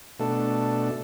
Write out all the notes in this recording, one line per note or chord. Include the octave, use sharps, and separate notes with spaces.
B2 A3 D4 A4